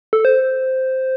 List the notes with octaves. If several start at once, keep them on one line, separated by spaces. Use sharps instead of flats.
A4
C5